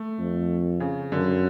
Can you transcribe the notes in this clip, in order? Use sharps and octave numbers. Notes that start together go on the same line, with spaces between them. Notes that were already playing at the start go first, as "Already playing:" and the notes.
Already playing: A3
F2
C#3
F#2 D3